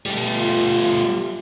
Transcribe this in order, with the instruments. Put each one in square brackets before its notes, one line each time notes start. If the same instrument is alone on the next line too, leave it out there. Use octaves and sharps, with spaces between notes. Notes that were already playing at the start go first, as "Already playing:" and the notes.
[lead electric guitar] G3 A3
[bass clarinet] F4